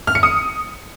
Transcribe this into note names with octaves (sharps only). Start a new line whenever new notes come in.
F6
C#7
D#6